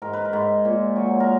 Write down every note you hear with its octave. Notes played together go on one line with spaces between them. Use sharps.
G#2 A#4
B4
A#4
G#2
A#2
F#3
A#4